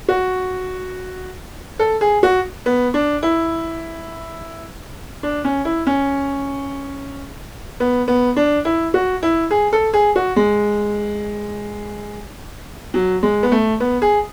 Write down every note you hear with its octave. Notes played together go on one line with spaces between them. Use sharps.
F#4
A4
G#4
F#4
B3
D4
E4
D4
C#4
E4
C#4
B3
B3
D4
E4
F#4
E4
G#4
A4
G#4
F#4
G#3
F#3
G#3
B3
A3
B3
G#4